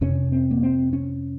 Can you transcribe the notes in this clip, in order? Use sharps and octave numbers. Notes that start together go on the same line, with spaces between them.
F2 C3 C#4
C4
A#3
C4
C#4